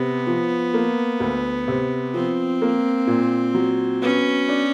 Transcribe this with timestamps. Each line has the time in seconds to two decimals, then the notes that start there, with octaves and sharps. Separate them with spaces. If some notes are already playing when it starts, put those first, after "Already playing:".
Already playing: C3 B3
0.27 F3
0.74 A#3
1.20 D2
1.68 C3
2.14 F3 C4
2.62 A#3
3.07 A#2
3.54 F#3
4.02 B3 C#4
4.49 D4